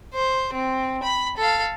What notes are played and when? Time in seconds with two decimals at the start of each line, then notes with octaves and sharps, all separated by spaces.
0.13 C5
0.53 C4
1.03 B5
1.37 A4 F5